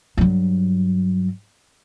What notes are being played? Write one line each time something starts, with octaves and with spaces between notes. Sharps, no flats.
G2 F#3